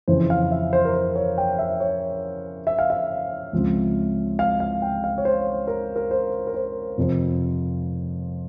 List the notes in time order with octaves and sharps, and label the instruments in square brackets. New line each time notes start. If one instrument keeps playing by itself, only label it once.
[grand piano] F2 C#3 E3 C5
F5
E5
C5
A#4
C5
C#5
G5
E5
C#5
E5
F5
E5
C#2 C#3 F3 C4
F5
F5
G5
F5
C#5
C5
A#4
A#4
C5
A#4
C5
F2 C3 F3